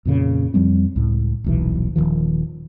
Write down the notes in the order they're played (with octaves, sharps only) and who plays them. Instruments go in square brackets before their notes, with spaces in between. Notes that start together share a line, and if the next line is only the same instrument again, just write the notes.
[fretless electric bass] F2 A#2 C#3
F2 F3 G3 C4
C#2 A2
D#1 B1 E3
D#1 B1 D#3 F3